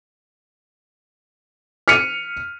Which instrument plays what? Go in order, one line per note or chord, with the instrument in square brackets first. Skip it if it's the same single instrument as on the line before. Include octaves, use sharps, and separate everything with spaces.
[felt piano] F6 B6 C#7 D#7